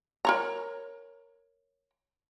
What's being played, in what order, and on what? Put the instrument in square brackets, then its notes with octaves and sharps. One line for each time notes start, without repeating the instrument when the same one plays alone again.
[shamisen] A#4 C#5 A#5